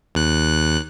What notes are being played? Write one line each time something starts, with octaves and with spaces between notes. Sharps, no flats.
D#2 F#6